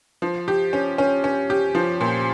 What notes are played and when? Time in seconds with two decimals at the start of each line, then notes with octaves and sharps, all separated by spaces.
0.22 F3
0.48 G4
0.73 C#4
0.98 C#4
1.24 C#4
1.50 G4
1.75 F3
2.01 A#2